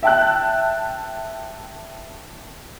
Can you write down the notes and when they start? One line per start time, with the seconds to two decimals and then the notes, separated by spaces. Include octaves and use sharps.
0.03 E5 G5 A5 F#6